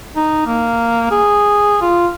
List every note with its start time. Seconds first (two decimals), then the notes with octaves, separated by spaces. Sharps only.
0.16 D#4
0.46 A#3
1.11 G#4
1.81 F4